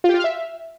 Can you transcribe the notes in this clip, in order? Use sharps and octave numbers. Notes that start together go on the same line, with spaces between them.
F4
G4
F4
F5
E5